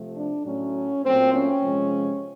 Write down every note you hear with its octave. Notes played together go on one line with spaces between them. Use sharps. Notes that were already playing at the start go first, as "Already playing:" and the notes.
Already playing: C3 F3 A3
D4
A2 F#3 A3 C#4
A#2 F#3 A3 C4
C#4
C3 F3 G#3